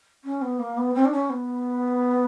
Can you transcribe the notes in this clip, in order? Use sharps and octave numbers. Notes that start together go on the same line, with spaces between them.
C#4
B3
A#3
B3
C4
D4
C#4
B3